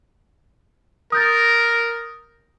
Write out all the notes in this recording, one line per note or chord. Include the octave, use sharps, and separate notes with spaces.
A#4 D#6 G6 A6